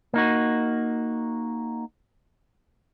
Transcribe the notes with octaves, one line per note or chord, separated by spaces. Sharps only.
A#3 D#4 F#4